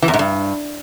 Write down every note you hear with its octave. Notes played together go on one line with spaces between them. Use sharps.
E3
E2
G#2
G2